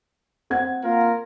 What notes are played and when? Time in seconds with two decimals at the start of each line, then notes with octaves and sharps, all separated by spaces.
0.50 C4 F#5 G#6
0.83 A#3 F4 A#4